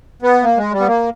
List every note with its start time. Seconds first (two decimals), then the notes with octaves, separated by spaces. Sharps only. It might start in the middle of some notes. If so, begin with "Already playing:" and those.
0.22 B3
0.44 A#3
0.58 G#3
0.72 G3
0.80 B3
0.87 A#3